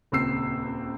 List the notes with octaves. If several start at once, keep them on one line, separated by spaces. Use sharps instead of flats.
D#1 C#2 C4 E6 C7